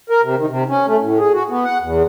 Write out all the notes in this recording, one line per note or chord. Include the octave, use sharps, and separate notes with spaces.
A#4
C3
D#3
C3
C#4
A3
A2
G#4
F#4
B3
F#5
E2